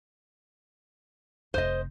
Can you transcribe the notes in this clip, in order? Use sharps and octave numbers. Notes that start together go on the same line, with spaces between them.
F1 E4 C5 D#5